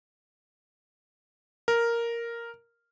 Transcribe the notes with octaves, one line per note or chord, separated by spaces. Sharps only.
A#4